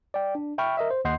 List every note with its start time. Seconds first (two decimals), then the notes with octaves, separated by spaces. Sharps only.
0.14 D5 G5
0.35 D4
0.58 E5 G5 B5 C#6 F6
0.77 A#4 D#5 E5
0.91 C5
1.05 D#2 D#5 F#5 C6 G6 C7